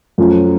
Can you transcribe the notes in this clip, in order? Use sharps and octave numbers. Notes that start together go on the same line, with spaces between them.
F#2 F3 A3 C#4 F4